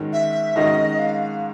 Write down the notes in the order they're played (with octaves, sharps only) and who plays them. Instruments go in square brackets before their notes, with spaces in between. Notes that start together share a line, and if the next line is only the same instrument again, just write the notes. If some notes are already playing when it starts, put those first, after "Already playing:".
Already playing: [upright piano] G#2 D#3 G#3 C#4 F#4
[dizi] E5
[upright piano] G#2 D#3 G#3 C#4 F#4 [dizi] D#5
[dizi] F5